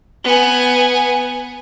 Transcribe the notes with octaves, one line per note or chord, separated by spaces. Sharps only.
B3 G#5